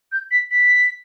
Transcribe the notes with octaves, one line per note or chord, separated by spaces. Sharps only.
G6
B6
B6